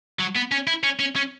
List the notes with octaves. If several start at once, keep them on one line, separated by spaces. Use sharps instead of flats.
F#3
B3
C#4
E4
C#4
C#4
C#4